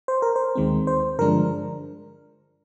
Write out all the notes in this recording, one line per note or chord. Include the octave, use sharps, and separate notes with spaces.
C5
A#4
C5
D#2 D#3 G#3 C4
C5
G2 D3 F3 G#3 D4 A#4